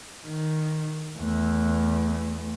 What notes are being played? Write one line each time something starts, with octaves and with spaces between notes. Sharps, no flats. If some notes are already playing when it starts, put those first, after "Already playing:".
D#3
E2 A3